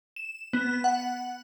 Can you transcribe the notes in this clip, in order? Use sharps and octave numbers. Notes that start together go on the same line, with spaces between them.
E7
B3
F#5